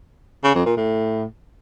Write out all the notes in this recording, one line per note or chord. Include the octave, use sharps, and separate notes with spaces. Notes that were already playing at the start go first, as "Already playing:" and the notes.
C#3
F2
A#2
A2